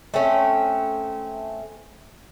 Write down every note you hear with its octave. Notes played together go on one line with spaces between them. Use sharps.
A3 C4 C#4